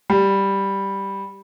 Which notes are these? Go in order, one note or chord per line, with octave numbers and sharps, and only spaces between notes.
G3